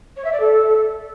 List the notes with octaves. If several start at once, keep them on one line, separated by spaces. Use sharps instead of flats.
C#5
E5
D5
A4